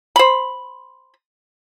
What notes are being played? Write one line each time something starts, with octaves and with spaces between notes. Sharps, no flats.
C5 B5